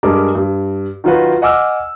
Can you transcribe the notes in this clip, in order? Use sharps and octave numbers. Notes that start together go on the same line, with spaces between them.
G2 G#3 A#4 D6
G2
D#3 F#3 F4 F#4 B4
D#5 F#5 G#5 D6 E6 F6